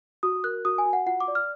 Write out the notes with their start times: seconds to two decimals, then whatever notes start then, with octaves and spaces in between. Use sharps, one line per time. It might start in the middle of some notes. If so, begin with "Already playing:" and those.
0.23 F#4 D#6
0.44 A#4 F#6
0.65 F#4 D#6
0.78 G#5
0.86 F#4
0.93 F#5
1.06 F4 F#5
1.21 D6
1.28 D5
1.35 F6